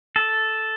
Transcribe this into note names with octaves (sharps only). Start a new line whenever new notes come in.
A4